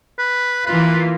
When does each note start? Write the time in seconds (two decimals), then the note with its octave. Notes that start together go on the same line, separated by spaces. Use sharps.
0.19 B4
0.67 E3 A#3 F4 B4